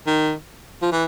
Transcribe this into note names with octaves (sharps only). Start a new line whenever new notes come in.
D#3
F3
E3